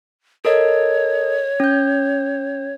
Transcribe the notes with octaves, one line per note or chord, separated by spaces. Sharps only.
A4 A#4 C#5 D#5
C#4 G6